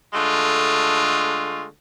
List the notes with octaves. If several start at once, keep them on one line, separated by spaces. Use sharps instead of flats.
D3 G#3 A3 F4